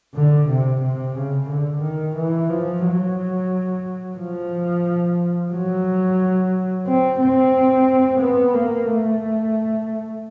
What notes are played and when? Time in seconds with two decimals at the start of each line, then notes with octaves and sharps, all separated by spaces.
0.15 D3
0.49 C3
0.82 C3
1.16 C#3
1.50 D3
1.83 D#3
2.16 E3
2.50 F3
2.85 F#3
4.18 F3
5.53 F#3
6.86 C4
7.20 C4
8.20 B3
8.54 A#3
8.87 A3